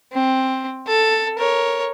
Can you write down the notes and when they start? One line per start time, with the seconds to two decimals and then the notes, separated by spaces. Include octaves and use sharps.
0.13 C4
0.87 A4
1.38 A#4 C#5